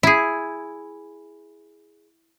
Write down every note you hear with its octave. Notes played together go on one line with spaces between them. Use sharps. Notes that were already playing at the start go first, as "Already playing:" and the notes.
E4 G#4